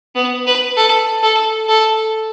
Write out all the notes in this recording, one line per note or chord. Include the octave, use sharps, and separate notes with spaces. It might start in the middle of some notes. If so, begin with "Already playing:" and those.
B3
B4
A4
A4
A4